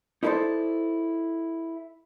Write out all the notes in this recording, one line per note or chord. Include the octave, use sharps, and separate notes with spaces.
D#4 E4 A4 B4 C5 D5